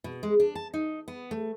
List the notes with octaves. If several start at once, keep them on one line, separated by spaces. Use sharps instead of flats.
B2
G#3
D4
A5
D#4
B3
A3